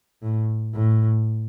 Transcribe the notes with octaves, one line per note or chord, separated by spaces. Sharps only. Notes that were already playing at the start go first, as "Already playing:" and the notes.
A2
A2